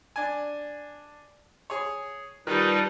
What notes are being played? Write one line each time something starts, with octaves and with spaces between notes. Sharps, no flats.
D4 G#5
G#4 C#5
D#3 G3 D#4 F4 G4 B4 A5